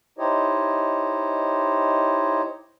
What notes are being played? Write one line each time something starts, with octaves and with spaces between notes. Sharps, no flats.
D#4 E4 G4 C5 C#5 D#5